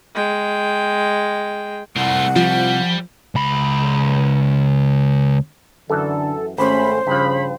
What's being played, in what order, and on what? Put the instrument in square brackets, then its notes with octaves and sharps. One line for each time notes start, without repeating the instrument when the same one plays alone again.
[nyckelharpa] G#3 G5
[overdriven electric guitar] C2 [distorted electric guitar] A3 F4 [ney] F#5
[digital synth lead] F3 [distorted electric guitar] G3
[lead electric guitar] C#2 B5
[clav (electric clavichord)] F#2 E3 [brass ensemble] D3 [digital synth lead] A4
[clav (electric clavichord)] G#1 [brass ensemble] A3 C#4 [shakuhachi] C5 [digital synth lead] B5
[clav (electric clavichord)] G2 F3 [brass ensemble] C#3 [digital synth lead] B5